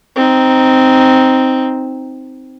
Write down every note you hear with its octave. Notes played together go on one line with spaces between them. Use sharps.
C4 D#4